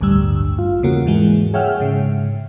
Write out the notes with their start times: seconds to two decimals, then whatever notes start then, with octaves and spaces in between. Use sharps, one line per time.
0.01 A1 D2 G2 G3 E6
0.59 F4
0.83 E2 C#3 A#3 F#4
1.06 G#2 E3 G#3
1.54 G#4 C#5 E5 F#5 G5 F6
1.80 G#2 C#3